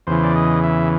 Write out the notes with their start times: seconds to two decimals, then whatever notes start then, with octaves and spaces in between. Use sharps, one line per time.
0.07 E2 C#3 E3 C5
0.24 D5
0.35 D#5
0.64 E5